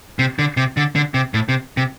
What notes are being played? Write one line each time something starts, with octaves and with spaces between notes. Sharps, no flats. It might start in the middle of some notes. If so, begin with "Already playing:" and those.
C3
D3
C3
D3
D3
C3
A2
C3
C3